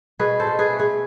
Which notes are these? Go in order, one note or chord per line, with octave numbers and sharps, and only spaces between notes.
B2 G#4 B4
A4 C5
B2
G#4 B4
A3
G#4 B4